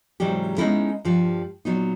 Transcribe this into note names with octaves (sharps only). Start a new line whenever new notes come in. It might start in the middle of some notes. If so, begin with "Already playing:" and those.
G#2 C3 E3 F#3 G3 G4
G#3 B3 C#4 D#4 E4 A4
G2 F3 G4
A#2 F#3 B3 D#4